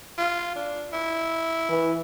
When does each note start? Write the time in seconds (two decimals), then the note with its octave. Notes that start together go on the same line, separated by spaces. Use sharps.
0.18 F4
0.55 D4
0.93 E4
1.69 E3